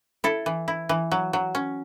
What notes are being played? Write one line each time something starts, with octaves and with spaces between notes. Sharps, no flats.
E4 A4
E3
E4
E3
F#3
F#3
C#4